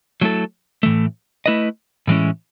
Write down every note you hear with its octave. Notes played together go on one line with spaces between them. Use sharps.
F#3 A3 E4 A4
A2 E3 A3
A3 E4 B4 D#5
A2 E3 G#3 C#4 E4